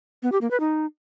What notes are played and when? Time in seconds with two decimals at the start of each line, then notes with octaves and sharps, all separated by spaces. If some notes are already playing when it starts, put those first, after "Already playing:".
0.23 B3
0.32 G4
0.41 A#3
0.51 B4
0.60 D#4